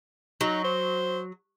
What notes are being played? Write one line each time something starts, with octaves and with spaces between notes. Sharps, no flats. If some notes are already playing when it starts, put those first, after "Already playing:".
F#3 D#4
C5